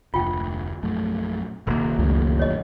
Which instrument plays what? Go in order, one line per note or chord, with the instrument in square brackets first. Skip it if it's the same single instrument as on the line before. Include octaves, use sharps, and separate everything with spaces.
[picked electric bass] F1 D2 [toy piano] F4 G5
[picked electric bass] A#1 F#2 A3
[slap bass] D#1 A#3 [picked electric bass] C2
[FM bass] C#2 [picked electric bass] F#2 A2 D3
[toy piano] C#5 D#5